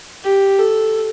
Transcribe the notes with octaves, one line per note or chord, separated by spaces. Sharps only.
G4
A4